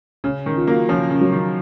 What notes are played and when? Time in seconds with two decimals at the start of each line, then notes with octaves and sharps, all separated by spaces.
0.24 C#3 C#4
0.46 D#3
0.57 F4
0.67 F#3 A#3
0.89 C#3 F3 C#4
1.10 C#3
1.21 F#3
1.32 D#3